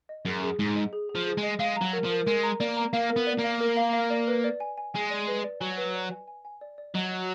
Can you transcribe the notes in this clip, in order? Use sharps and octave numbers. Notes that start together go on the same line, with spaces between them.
D#5
F#2 G#4
G#4
G#2 G#4
D#5
G#4
G#4
F3
G#4
G#3
D#5
G#3 F5
A#5
F#3
A#4
F3
A#4
G#3 A#4
A#5
A#3 D5
A#5
A#3 F5
A#4
B3
D5
A#3
F5
A#4
F5
F5
D5
B4
D5
G#5
G#5
G#3 G#5
D5
B4
D5
F#3 G#5
B4
D5
G#5
G#5
G#5
D5
D5
F#3 D#5
D#5